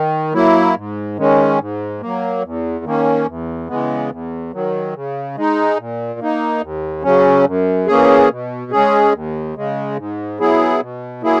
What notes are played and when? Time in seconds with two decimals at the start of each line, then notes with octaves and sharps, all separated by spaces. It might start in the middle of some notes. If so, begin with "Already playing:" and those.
Already playing: D#3
0.33 F#3 A#3 E4
0.76 G#2
1.17 D#3 G#3 C#4
1.60 G#2
2.01 F#3 A#3
2.43 E2
2.84 D#3 A#3 C#4
3.26 E2
3.68 C#3 E3 G#3 B3
4.10 E2
4.53 D#3 F#3
4.94 C#3
5.36 G#3 D#4
5.78 A#2
6.19 A#3 D#4
6.62 D#2
7.03 C#3 F#3 C#4
7.46 F#2
7.87 E3 A#3 C#4 G#4
8.30 B2
8.71 G#3 C#4 G#4
9.13 D#2
9.56 C#3 G#3
9.97 G#2
10.39 F#3 B3 E4 G#4
10.81 B2
11.23 F#3 A#3 E4 G#4